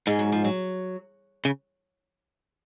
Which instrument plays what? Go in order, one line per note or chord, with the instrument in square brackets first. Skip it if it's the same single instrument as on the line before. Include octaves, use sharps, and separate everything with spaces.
[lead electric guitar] G#2 [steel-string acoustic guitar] G#3
[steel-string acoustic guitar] F#3
F3
F#3
[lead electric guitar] C#3